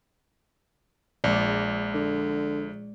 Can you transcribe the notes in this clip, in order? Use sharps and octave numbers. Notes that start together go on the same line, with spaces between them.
A#1 G#3 D5
D3